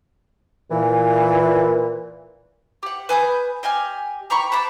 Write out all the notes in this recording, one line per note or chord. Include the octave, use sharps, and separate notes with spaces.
A#2 E3
G4 F#5
B4 G#5 D#6 G6
G4 D#5 G#5 F6
G4 A#5 B5 C#6
F#5 A5 B5 D6